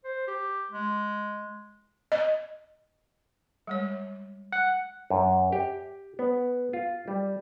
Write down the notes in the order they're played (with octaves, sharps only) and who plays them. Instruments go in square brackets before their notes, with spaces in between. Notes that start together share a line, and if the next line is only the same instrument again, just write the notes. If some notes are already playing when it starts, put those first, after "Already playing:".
[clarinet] C5
G4
G#3
[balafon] D#5
G3 G#3 C#5
[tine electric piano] F#5
[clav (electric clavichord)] F#2
G4
B3
F4
G3